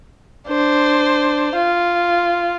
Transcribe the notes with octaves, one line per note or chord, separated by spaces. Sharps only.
D4 C5
F4